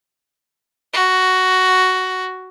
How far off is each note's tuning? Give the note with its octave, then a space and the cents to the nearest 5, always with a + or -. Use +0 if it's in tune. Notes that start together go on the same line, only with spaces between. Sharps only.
F#4 +10